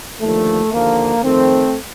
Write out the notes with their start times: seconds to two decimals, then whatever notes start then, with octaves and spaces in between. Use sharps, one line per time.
0.21 D#2 D3 F3 A3
0.73 D#2 D3 F3 A#3
1.23 F2 D#3 A3 C4